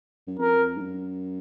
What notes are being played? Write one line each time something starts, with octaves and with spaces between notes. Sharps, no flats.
F#2
F2 A#4
G#2
F#2